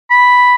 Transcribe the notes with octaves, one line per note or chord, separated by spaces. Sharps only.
B5